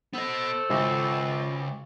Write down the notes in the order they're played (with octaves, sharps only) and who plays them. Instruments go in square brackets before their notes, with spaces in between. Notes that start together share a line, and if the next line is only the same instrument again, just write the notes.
[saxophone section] A3 A4 C5 [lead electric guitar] B3 D#5
[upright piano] G#1 [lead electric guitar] C#2 [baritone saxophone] F4